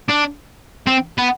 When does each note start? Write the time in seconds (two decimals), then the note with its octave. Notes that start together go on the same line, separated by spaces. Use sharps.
0.09 D4
0.87 C4
1.18 B3